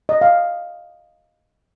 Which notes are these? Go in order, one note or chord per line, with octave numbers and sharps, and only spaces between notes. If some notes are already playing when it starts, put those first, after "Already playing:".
D#5
F5